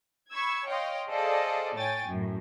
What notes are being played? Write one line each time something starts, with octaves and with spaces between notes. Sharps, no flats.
B5 C#6 E6 G#6
C#5 D#5 F5 G5 C6
G#4 A4 C5 D5 D#5 F5
A2 C#5 G5 G#5 A6
F#2 A2